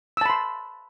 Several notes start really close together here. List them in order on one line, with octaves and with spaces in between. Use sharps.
E6 A5 B5 C6